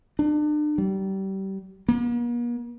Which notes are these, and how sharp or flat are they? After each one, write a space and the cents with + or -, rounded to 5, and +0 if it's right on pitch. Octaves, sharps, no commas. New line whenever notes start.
D4 +35
G3 -30
A#3 +45